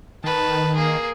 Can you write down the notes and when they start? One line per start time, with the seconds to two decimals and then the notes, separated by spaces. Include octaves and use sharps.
0.24 D#3 B4 A5
0.75 A#3 G#4